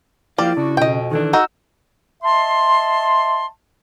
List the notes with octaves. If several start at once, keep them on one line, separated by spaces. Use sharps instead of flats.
F3 A#3 E4 G4 D5 F5
C#3 D4 F#4
F2 B2 D#5 G5
D#3 E3 D4 A4
D#4 F#4 E6
D#5 E5 A5 C6